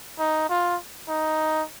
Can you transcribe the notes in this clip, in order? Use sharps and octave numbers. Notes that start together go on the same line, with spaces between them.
D#4
F4
D#4